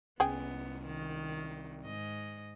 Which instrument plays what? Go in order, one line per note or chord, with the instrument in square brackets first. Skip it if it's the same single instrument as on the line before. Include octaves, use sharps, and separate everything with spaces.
[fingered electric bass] C2 C#4 [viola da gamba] B3 [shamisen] G#4 G5
[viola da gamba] D#3
G#2 D#5